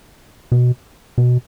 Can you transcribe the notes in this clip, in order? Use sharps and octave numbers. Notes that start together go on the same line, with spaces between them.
B2
B2